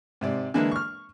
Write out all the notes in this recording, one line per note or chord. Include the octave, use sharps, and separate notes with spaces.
G#2 C3 D5
D3 E3 G#3 A#3 D4
C#6 F6